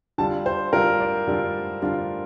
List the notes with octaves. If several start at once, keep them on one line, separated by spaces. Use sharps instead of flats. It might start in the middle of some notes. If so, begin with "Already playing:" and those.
D3 G3 D4 F4 A5
C5
D3 G3 D4 F4 A#4
D5
D3 G3 D4 F4
D3 G3 D4 F4